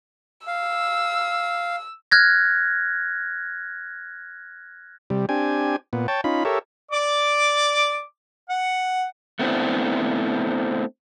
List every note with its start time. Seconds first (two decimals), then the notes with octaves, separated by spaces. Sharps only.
0.47 F5 E6
2.11 F6 F#6 G#6 A#6
5.10 C3 G3
5.29 C4 D4 G4 G#5
5.93 A#2 B3
6.08 C#5 G5 A5
6.24 C#4 D#4 F4 B5
6.45 G4 A4 A#4 C#5 E5
6.91 D5 D6
8.50 F#5
9.39 A3 B3 C4 D4 E4